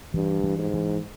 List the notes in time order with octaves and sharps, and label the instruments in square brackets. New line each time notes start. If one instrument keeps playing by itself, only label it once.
[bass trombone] G2 [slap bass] E3
[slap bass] E3
[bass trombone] G#2
[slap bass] E3